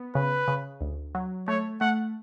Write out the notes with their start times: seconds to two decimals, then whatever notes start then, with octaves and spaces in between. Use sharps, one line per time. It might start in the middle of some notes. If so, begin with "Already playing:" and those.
Already playing: B3
0.15 C#3 B4
0.48 C#3
0.81 D2
1.15 F#3
1.48 A3 C#5
1.81 A3 F#5